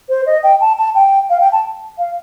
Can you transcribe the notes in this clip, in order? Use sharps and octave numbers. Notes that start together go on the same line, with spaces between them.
C5
D#5
G5
A5
A5
G5
F5
G5
A5
F5